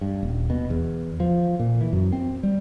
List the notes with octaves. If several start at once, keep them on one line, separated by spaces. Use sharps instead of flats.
G2
D#1
B2
E2
F3
A#2
E3
F#2
C4
G3